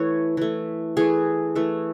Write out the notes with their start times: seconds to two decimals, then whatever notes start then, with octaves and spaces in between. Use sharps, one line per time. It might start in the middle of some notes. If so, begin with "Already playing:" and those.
Already playing: E3 A3 C#5
0.37 E3 A3
0.97 E3 A3 G#4
1.56 E3 A3